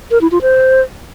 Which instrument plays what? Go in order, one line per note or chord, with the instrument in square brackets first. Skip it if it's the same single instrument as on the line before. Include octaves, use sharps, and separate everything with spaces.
[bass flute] A#4
E4
F4
C5